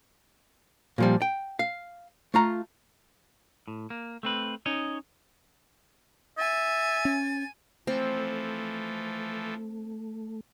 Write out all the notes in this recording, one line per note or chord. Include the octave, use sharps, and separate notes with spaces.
A#2 F3 G3
G5
F5
A3 F4 A#5
A2
A#3
A3 C4 B4
C#4 D#4 C#5 D#5
E5 G#5 A6
C#4
E3 F3 A3 C4 A4